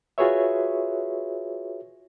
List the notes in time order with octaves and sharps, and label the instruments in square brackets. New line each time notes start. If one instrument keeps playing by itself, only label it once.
[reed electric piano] F4 F#4 G#4 B4 C#5 E5